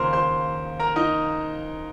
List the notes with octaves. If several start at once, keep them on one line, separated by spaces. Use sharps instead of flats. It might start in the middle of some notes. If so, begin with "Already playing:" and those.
Already playing: D#2 C#3 F3 A#4 C5 C6
C5 C6
A#4 A#5
D#4 D#5